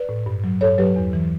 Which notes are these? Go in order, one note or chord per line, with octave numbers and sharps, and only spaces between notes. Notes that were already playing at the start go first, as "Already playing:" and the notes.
Already playing: B4 D5
A2
G2
F#3
G2 A4 C#5
F#3 G4 B4
E2
E3